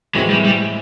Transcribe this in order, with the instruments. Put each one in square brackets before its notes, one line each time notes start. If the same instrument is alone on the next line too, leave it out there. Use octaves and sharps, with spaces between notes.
[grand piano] A2 E3 G#3 C4 E4 [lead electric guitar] F#3
[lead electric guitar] G3
G3